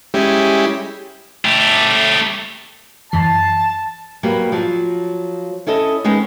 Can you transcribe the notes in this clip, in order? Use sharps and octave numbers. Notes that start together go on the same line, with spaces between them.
G3 G#3 C#4 E4 G4
A3 G4
F#2 E3 A5 C7
F#3 G3 A#3 B3
F3 F#3
C#4 E4 A4 D#5
D#3 G#3 B3 C#4 D#4